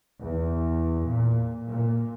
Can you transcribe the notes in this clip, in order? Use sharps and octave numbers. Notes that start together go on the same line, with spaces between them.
E2
A#2
A#2